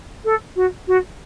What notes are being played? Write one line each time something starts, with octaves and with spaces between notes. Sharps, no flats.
A4
F#4
F#4